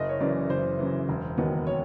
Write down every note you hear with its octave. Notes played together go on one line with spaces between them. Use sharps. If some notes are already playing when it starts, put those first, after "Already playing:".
Already playing: F#1 D#5
C#5
F#2 C#3 E3 D5
F#1 C5
F#2 C#3 E3
E1
D#2 D#3 F#3 B3
C#5